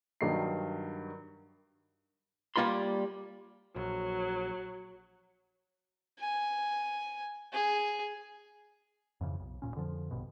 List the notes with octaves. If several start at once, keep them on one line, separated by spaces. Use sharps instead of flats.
G2 D#3 F#3 D#4 D#5 C7
G3 A#3 F4 B5 C6
A#1 F#3
G#5
G#4
F2 G#2 C#3 E3
B1
D#1 A#2 C#4
F2 D3 F3
A#1 G2 B2